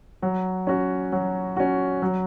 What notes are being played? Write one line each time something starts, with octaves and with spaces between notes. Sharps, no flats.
F#3
C#4 F#4
F#3
C#4 F#4
F#3